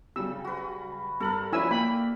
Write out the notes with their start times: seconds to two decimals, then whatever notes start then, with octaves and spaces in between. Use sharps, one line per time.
0.16 C#3 F#3 G3 E6
0.45 F#4 B4
1.20 G2 A4 A#4 F#7
1.53 F3 C#4 E4 F#4 D5 G#5 E6
1.71 A#3 G5 B5